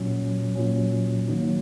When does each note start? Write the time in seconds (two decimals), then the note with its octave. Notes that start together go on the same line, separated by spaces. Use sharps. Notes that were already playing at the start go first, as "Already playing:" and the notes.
Already playing: A#2 F#3 C#4
0.55 A#2 F#3 C#4
1.28 D#3 F#3 A#3 D#4